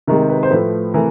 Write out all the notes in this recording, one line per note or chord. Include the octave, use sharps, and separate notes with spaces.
C3 D#3 G#3 A#4
B4
C5
A2 F3 A3 B4
C3 E3 A3 A#4